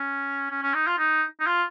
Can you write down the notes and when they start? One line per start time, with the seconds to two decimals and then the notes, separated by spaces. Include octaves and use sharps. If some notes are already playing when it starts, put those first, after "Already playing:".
Already playing: C#4
0.50 C#4
0.62 C#4
0.74 D#4
0.87 F4
0.98 D#4
1.40 D#4
1.47 F4